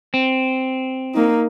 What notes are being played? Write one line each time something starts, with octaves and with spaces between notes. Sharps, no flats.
C4
A#3 D#4